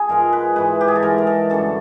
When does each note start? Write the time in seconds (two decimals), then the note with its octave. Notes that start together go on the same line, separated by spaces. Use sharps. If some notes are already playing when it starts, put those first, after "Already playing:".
Already playing: G#4
0.09 G#2 F3 G#3 A#4
0.33 B4
0.56 G#2 E3 G#3 B4
0.81 G4
0.88 G#4
0.96 A4
1.03 G#2 E3 G#3 A#4
1.18 A#4
1.27 A4
1.50 F#2 D3 G3 A4